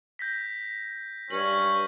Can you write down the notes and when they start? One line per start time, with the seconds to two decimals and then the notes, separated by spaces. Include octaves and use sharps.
0.19 G6 A#6 B6
1.30 G2 C#4 F#7